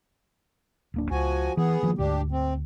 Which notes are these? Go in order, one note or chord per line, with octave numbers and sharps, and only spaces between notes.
D1 A#3 D4
C#2 F3 F#4 G#5
E3 B3 G#4
D#3 F3 A#3
D2 G#2 D3 D4 G4
C4